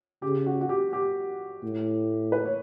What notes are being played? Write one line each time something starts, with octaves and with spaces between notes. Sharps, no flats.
C#3 G4
F#4
F#4
G4
G4
A2
B4
C#5